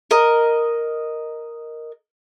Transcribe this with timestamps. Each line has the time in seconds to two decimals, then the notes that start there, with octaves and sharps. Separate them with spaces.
0.11 A#4 D#5